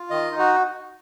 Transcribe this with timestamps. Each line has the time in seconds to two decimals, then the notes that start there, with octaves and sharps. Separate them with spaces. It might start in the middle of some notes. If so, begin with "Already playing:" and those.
Already playing: F4
0.10 D#3 D#5
0.32 D#4
0.39 F#4